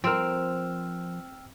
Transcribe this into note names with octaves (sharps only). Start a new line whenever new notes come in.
F3 C4 A#4 G5 E6 F6